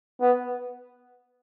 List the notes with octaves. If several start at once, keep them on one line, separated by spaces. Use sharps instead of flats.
B3